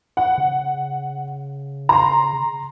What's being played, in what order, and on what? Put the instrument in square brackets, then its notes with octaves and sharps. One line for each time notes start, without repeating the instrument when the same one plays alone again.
[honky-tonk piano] F#5
[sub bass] C#3
[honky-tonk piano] A#5 C6